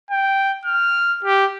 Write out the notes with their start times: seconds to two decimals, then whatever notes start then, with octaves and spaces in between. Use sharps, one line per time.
0.11 G5
0.65 F6
1.25 G4